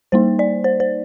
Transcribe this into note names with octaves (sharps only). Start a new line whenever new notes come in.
G3 A#3 D#4 C5
D5
C5
C5